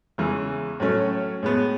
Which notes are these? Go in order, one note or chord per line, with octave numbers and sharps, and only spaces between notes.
E2 C#3 E3 G#3
A2 F#3 A3 C#4
A2 G#3 B3